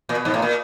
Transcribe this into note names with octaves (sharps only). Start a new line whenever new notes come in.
A#2
B2
G#2
A2
A#2